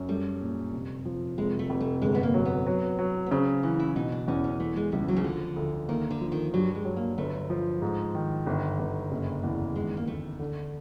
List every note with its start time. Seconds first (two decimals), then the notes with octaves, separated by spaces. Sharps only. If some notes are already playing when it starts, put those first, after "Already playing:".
Already playing: F#2
0.09 G3 A3
0.42 A#2
0.73 F1
1.05 F3
1.38 F1 G#3
1.59 A3
1.70 F1
1.80 A3
2.02 G1 G#3
2.15 B3
2.23 A#3
2.34 F#3
2.45 B3
2.67 F#3
2.99 F#3
3.26 B3
3.31 C#3 C4
3.63 E3 C#4
3.79 E4
3.95 B2 D#4
4.12 D4
4.28 E2 C#4
4.44 C#4
4.60 E3 A3
4.76 G#3
4.92 C#2 G3
5.08 F#3
5.17 C#3
5.24 D3 F3
5.56 D2
5.88 D#3 A#3
6.11 D3
6.21 F3
6.32 D#3
6.53 G2 F#3
6.75 G#3
6.85 F#3
6.96 A#3
7.18 G1 A3
7.50 F3
7.82 G#2
8.15 D#3
8.46 G1
8.79 G1
9.11 F#1
9.44 E2
9.76 D#3 G#3
9.97 A#3
10.07 D2 A3
10.39 D3